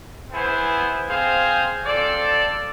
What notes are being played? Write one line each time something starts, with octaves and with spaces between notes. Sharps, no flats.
B3 E4 G#4 C5
C4 G#4 C5 F5
C4 F4 A4 D5